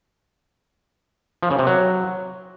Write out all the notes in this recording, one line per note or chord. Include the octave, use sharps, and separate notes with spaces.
F3
C#3
C3
F#3